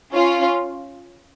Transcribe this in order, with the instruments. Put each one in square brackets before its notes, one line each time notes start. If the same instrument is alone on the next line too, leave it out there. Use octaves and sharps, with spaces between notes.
[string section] C#4 F4